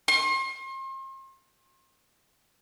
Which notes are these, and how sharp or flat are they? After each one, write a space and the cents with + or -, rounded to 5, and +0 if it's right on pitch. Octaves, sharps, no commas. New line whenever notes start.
C6 +40